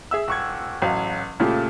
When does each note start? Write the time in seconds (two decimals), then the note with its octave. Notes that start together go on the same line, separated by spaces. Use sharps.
0.11 G#4 E5 E6
0.28 D#1 C#6 G#6
0.82 A1 F#3 F5
1.40 A#2 C#3 A3 F4 G4